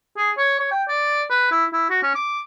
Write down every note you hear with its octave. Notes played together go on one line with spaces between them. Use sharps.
G#4
C#5
C#5
G5
D5
B4
E4
E4
F#4
C#4
D6